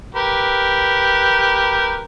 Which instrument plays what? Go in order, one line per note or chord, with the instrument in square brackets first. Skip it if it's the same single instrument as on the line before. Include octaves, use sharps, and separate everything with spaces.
[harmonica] G4 A#4 B4